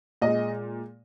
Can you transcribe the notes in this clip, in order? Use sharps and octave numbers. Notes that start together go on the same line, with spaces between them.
A#2 G#3 D#5